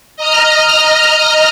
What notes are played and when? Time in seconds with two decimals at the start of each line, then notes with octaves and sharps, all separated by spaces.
0.16 D#5 A#5 F6